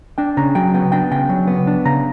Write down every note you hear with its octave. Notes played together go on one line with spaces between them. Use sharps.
D4 G5
C#3 A#5
F#3 G5
B3 G5
D4 G5
C#3 G5
F#3
B3
D4
C#3 A#5